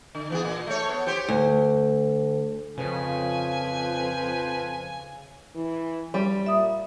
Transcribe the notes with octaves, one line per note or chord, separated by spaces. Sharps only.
D3
E3 B3 G#4
A#2
A3 C#5
B3
G4 C5 C#5
D2
F2 C#3 F3 C4 B4 G#5
E3
G2 G3
A#2 E5 D#6